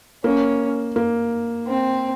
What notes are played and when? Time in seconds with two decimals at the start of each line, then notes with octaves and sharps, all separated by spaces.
0.24 A#3 C#4
0.96 A#3
1.67 C4